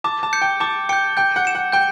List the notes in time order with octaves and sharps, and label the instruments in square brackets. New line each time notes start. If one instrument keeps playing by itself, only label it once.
[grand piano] A5 [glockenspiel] D6
[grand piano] A5
[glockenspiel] G6 C#7
[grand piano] G5
[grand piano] A5 [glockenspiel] D6
[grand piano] G5 [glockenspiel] G6 C#7
[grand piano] G5 [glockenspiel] G6
[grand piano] F#5
[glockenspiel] C#7 E7
[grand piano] F#5
[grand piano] G5 [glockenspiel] G6